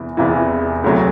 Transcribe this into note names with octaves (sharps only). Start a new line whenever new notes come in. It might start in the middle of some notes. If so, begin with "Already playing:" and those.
Already playing: E1 E2 C3 E3
E1 E2 C3 E3
E1 D2 C3 F#3